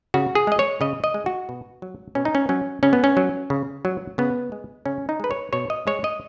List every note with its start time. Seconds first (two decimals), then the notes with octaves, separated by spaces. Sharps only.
0.14 C#3 F#4
0.35 G#4
0.47 G#3 D#5
0.59 C#5
0.81 C#3 D#5
1.04 D#5
1.14 G#3
1.26 F#4
1.49 B2
1.82 F#3
2.15 B2 C#4
2.25 D#4
2.35 C#4
2.49 F#3 C#4
2.83 C#3 C#4
2.93 B3
3.04 C#4
3.17 F#3
3.50 C#3
3.85 F#3
4.18 C#3 B3
4.52 G#3
4.86 C#3 C#4
5.09 D#4
5.20 G#3 B4
5.31 C#5
5.53 B2 C#5
5.70 D#5
5.87 G#3 C#5
6.04 D#5